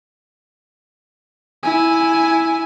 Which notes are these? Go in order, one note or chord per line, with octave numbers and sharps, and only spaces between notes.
E4 G#5